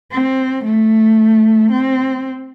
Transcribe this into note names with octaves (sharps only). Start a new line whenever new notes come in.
C4
A3
C4